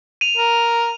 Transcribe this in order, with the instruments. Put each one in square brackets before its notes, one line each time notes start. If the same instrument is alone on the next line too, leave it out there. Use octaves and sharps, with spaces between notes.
[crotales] D#7 F7
[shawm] A#4